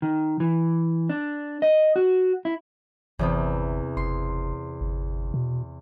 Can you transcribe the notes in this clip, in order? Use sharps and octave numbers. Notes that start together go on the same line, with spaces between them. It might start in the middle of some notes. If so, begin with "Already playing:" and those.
D#3
E3
D4
D#5
F#4
E4
G1 E2 C3 B3
F#1 C6
G1
B2